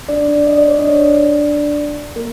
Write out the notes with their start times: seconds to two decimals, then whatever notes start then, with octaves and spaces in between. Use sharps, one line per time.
0.09 D4 D5
0.28 D4 D5
0.47 D#5
0.58 D5
0.68 C#5
0.79 D4 D5
2.16 A#3 A#4